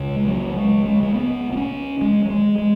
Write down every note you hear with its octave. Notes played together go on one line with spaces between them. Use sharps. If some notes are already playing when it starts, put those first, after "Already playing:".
Already playing: C#2 C#3
G#3
F#3
G#3
G#3
G#3
B3
B3
C#4
G#3
F#3
G#3
G#3